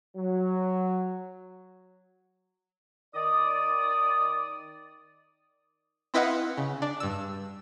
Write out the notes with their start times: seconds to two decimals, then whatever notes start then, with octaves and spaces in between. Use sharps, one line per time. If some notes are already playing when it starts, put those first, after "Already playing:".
0.16 F#3
3.15 D#3 D5 D#6
6.14 C4 E4 B4 D#5 F5 F#5
6.58 C#3
6.82 D4
7.00 G2 E6